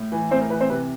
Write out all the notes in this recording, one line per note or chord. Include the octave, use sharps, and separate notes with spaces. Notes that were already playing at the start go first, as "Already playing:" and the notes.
Already playing: A2
E3
A2 C4 C5
A#4
E3 B4
C4 C5
C3 B4